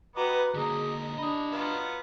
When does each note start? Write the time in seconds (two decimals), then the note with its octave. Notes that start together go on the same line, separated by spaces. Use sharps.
0.16 B3 F#4 G4 B4 D#5 A#5 D6
0.55 D3 A#3 D#4 G#4
1.18 D4 G4 D#5 B5 D#6
1.52 F#3 B3 F4